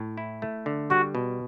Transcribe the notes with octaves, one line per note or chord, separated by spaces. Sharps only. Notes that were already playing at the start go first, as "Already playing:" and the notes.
Already playing: A2
E4
A3
D3
G3 F#4
B2